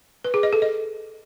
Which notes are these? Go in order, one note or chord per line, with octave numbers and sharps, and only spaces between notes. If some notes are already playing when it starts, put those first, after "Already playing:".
B4
G#4
D#5
A4
D#5